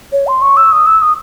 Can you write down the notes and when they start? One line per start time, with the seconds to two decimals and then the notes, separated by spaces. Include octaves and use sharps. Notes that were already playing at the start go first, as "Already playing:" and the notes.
0.12 C#5
0.27 C6
0.42 C#6
0.57 E6
0.72 D#6
0.86 E6
1.02 D#6